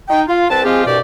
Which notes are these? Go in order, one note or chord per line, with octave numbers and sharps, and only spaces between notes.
D#4 G5
F4
C2 C4 B4 A5
F3 G#3 C4 F4 G4 G#4
C2 G2 B2 G4 D5